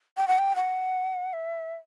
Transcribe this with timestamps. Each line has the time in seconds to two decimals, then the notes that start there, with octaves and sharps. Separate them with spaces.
0.17 G5
0.28 F#5
0.38 G5
0.56 F#5
1.33 E5